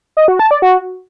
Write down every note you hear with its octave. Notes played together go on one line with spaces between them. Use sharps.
D#5
F#4
A5
D5
F#4